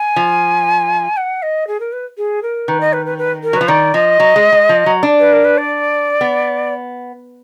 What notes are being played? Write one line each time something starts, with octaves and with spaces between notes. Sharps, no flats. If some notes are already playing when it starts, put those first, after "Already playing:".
Already playing: G#5
F3
F#5
D#5
G#4
A#4
B4
G#4
A#4
D#3 B4
D#5
B4
B4
B4
A#4
F#3
F3 B4
D#3 D5
F3 D#5
F#3
G#3
G#3
F3
F#3
D4
B4
A#4
B4
D5
B3